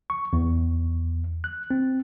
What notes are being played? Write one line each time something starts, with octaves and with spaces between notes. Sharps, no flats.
C#6
E2
F#6
C4